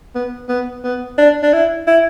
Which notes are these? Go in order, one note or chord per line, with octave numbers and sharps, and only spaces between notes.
B3
B3
B3
D4
D4
E4
E4